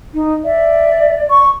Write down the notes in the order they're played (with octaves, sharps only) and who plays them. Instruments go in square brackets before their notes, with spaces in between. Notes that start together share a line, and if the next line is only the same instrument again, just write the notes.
[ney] D#4
[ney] D5 [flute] E5
[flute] C#6